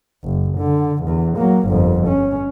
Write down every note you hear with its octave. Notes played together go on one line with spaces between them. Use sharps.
F#1
D3
E2
F#3 A#3
G1 F2
C#4